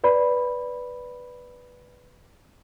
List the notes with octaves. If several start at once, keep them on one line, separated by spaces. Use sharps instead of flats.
B4 D5 B5